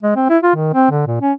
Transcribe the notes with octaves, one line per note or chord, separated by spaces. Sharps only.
G#3
C4
E4
F4
D#3
C4
D3
A#2
C#4